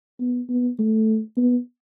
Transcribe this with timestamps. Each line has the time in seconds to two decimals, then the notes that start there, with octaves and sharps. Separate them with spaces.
0.20 B3
0.49 B3
0.79 A3
1.37 B3